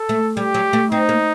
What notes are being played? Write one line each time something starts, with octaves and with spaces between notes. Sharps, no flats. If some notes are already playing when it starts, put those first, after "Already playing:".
Already playing: A4
A3
G3 G4
F#3
A3
C4 D#4
A#3